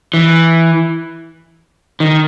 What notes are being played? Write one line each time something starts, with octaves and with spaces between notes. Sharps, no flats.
E3
D#3